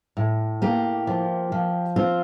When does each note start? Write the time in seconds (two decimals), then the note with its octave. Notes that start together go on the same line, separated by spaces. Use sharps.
0.17 A2
0.62 A#3 G4
1.07 F3
1.52 F3
1.96 C4 F4